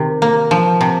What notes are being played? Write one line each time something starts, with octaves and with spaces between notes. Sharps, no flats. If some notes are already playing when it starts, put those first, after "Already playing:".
Already playing: C3 D#3
A#3
F3
C3